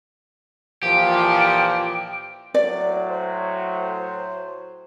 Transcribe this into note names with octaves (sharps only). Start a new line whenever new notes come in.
A#2 E3 F3 G4
A2 F#3 D5
C5